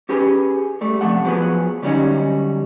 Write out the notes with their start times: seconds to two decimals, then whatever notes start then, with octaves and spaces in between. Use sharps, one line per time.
0.09 C#4 G4 G#4 B4
0.81 G3 A3
1.01 C3 F3 A3 F#5
1.25 F3 F#3 B3 G#4
1.82 D3 F#3 G3 C#4 D#4